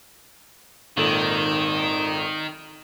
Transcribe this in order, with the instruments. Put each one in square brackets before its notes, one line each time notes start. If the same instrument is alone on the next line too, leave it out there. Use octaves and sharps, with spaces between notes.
[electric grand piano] G#1 A#2 A4 [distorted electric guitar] D#3